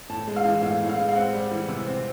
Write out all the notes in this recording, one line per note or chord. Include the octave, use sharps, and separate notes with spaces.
A2 A5
G#3
F5
E3
A2 F5
A2
F5
G#3
F5
C4 F#5
G3
E3
C3
C4